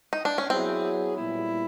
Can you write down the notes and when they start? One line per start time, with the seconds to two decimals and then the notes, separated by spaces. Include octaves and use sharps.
0.13 D#4
0.25 D4
0.38 C#4
0.50 F#3 B3 C4 E4 G#4
1.15 A#2 G3 B3 E4